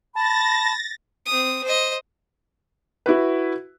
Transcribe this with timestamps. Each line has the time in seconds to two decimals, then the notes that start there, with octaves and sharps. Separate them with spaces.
0.15 A5 B5 A6 A#6
1.26 C4 D#6
1.64 C5 D#5
3.06 E4 F#4 B4